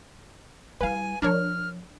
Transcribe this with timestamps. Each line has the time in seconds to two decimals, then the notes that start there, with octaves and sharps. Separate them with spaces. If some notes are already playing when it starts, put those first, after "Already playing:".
0.81 G3 E4 B4 F5 G#5
1.22 F3 D4 A#4 C#5 F6